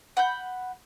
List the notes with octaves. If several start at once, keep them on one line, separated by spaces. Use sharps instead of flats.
F#5 B5 G6